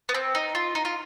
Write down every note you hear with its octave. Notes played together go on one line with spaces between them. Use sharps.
B3
C4
D#4
F4
D#4
F4